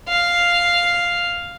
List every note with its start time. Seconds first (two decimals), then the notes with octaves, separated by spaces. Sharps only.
0.08 F5